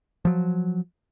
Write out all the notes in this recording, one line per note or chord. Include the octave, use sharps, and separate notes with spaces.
F3 F#3